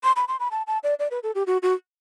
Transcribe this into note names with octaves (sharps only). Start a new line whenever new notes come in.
C6
B5
C6
B5
A5
A5
D5
D5
B4
A4
G4
F#4
F#4